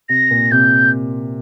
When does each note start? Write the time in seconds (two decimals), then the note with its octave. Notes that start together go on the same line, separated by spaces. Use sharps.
0.09 C3 A#6
0.31 A#2
0.51 C3 G6